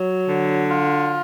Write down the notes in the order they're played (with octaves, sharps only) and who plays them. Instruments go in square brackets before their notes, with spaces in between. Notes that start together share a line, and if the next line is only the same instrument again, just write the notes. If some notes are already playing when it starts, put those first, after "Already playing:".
Already playing: [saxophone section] F#3
D3
F4